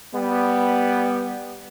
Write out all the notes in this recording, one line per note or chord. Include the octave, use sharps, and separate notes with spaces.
G3 B3